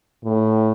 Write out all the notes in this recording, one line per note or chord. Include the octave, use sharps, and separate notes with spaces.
A2